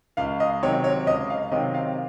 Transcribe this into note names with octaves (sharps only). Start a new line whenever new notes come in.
C#2 F5
D#5
C3 D#3 F#3 C4 C#5
C#5
C#2 D#5
F5
C3 D#3 F#3 C4 D#5
F5